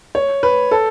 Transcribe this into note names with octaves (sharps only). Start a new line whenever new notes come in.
C#5
B4
A4